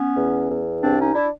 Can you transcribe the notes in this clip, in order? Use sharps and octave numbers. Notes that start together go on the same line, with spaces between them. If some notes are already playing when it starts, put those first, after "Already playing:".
Already playing: B3 C#4
E2
E2
C2 C4 D4
C#4 D#4
D4 E4